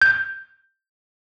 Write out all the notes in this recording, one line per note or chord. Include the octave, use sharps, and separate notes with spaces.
G6